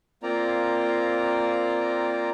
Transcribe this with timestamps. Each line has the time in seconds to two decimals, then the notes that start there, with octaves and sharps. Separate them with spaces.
0.23 A#3 C4 F4 D5 A#5